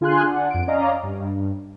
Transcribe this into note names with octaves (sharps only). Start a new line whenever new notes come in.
D3 F4 G#4 G#5 C6 F#6
D4 F#5
F2 D7
C#4 D5 D#5 F5 A#5
G2